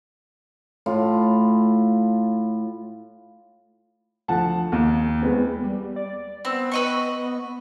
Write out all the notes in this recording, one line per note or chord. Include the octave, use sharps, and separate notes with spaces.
A2 F4
D2 F3 F#5 A5
D#2
E2 G#3 B3 C4
G3
D5
B3 C4
B4 D#5 C#6